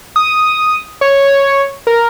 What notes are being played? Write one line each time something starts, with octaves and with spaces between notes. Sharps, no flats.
D#6
C#5
A#4